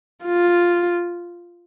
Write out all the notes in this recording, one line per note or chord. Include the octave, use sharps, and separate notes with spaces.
F4